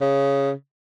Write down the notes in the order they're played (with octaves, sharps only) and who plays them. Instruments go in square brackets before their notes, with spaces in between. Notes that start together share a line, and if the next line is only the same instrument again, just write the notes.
[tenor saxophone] C#3